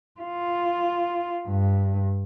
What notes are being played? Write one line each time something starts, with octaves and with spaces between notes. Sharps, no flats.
F4
G2